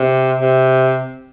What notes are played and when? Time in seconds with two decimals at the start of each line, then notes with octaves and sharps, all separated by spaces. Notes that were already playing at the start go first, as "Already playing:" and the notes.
Already playing: C3
0.40 C3